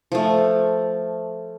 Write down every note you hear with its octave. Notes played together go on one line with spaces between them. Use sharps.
F3 A3